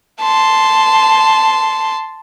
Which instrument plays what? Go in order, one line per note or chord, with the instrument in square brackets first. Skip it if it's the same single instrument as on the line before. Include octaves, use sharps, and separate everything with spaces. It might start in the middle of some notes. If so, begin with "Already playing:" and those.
[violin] A5 C6